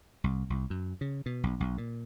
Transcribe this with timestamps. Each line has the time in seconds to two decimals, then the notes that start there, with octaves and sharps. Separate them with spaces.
0.24 C2
0.50 C2
0.70 F#2
1.01 C#3
1.26 B2
1.43 B1
1.60 B1
1.78 A#2